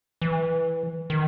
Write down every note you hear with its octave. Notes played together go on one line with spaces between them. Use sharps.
E3
D#3